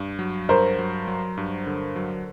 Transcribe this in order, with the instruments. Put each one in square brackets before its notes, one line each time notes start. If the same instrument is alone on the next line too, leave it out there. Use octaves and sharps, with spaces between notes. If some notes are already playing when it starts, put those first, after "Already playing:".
Already playing: [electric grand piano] G2
F#3
[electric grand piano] G2 [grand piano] A#4 C5
[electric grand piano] F#3
F#3
G2
D3
F#3